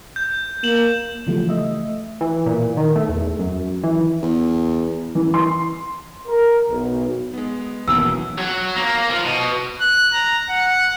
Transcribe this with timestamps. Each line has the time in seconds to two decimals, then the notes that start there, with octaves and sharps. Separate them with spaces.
0.16 G6
0.63 A#3 E7 F#7
1.27 C#3 E3 F3 G3 A3
1.49 A3 D#5 E5
2.21 E3
2.46 A#2
2.77 D#3
2.96 A3
3.09 E2
3.39 F#2
3.84 E3
4.23 E2
5.15 E3
5.34 C6
6.27 A#4
6.69 B1
7.33 G#3 B3
7.88 D#1 B1 E3 A#3 B3 C#4 E4 E6
8.38 F#3
8.76 A#3
9.10 F3
9.25 B2
9.81 F#6
10.14 A#5
10.49 F#5